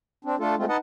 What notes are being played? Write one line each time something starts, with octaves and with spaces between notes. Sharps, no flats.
C4 D4
A3 D4 F4 A4
G#3 A3 C4 F4
D#4 B4 D#5 F#5 A5